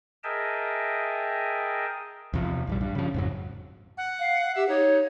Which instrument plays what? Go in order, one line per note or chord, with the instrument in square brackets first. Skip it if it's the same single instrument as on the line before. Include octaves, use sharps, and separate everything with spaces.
[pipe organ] G#4 A#4 D#5 E5 G5 A5
[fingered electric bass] E2 C3 F3
A#1 E3 G3
G2
C#3 F3
F2 G#2 F#3
[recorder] F#5
[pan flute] F5
[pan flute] G4 [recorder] E5
[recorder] D#4 [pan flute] C#5